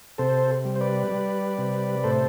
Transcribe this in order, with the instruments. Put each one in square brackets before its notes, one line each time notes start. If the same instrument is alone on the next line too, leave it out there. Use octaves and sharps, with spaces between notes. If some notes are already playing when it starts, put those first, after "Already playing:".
[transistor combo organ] C3 A4 C5
G3
C5
B4 D5
G3
C3
A2 A4 C5